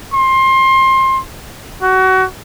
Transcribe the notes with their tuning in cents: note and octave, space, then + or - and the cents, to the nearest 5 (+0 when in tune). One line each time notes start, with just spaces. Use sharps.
C6 +25
F#4 +25